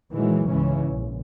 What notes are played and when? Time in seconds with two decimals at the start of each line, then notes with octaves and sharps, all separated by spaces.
0.12 A#2 D#3 E3 F#3 G#3
0.49 C#2 G#2 C#3 E3 C#4
0.85 A#1